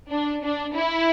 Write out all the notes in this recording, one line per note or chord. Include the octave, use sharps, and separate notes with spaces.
D4
D4
E4